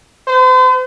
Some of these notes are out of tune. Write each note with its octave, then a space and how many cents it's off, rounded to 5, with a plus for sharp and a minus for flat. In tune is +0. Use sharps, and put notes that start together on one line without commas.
C5 -45